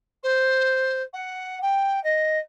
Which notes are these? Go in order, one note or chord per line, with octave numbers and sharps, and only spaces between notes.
C5
F#5
G5
D#5